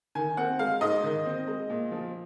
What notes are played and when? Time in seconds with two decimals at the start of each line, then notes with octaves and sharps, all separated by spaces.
0.15 D#3 G#5
0.37 C4 F#5
0.59 G#3 F5
0.81 G#2 D#5
1.03 D#3
1.26 C4
1.47 G#3
1.70 A#2
1.92 F3